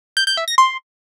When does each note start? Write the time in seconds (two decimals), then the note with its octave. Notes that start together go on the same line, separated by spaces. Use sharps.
0.17 G6
0.27 G6
0.37 E5
0.48 A#6
0.58 C6